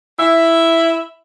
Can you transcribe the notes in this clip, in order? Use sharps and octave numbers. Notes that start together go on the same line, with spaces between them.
E4 E5